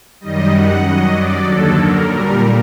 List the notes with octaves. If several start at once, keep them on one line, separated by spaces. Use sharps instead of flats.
F#2 D#3 G3 D#5
F#5
F#2 F#3 D#5
D5
D#2 D3 F#3 A4
A#4
A#2 G3 A#4